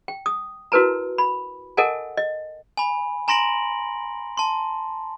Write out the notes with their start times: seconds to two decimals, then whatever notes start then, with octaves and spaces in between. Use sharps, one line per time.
0.08 G5
0.26 D#6
0.72 E4 F#4 A#4 B4 A5 A#5
1.18 B5
1.77 A4 A#4 D#5 F#5 G#5 A5
2.17 D#5
2.77 G#5 B5
3.28 G#5 A#5 C6 A#6 D7 F#7
4.37 A5 C6